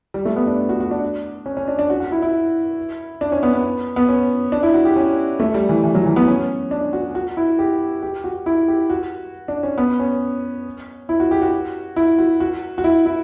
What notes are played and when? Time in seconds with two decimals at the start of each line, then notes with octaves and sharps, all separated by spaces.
0.14 G3
0.25 A3
0.36 B3
0.47 D4
0.69 F#4
0.80 F#4
0.91 D4
1.46 C#4
1.57 C#4
1.68 D4
1.79 D4
1.90 F#4
2.00 F#4
2.12 E4
2.22 E4
3.21 D4
3.32 C#4
3.43 B3
3.53 B3
3.96 B3
4.09 C#4
4.52 D4
4.63 E4
4.74 F#4
4.85 G4
4.96 C#4
5.40 A3
5.54 G3
5.69 E3
5.84 E3
5.95 F#3
6.06 E3
6.16 B3
6.27 C#4
6.71 D4
6.93 F#4
7.15 F#4
7.37 E4
7.59 G4
8.03 G4
8.24 F#4
8.46 E4
8.68 G4
8.90 F#4
9.48 D4
9.63 C#4
9.78 B3
9.99 C#4
11.09 E4
11.20 F#4
11.31 G4
11.42 F#4
11.96 E4
12.18 F#4
12.40 F#4
12.78 F#4
12.84 E4
13.06 E4